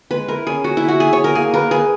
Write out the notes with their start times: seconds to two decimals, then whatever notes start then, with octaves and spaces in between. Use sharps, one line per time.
0.11 G#3 B4
0.28 E4 A#4
0.47 C#4 G#4
0.64 F#4 G#5
0.77 E4
0.82 E5
0.88 F#4
1.00 G#4 G#5
1.13 C#5
1.18 G#5
1.24 A#4
1.35 A#3 G#4
1.54 A#4 B4
1.71 G#4 B4